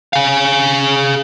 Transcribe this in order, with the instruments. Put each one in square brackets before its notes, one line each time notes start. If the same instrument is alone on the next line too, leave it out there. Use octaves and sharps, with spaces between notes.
[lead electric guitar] G#4 F5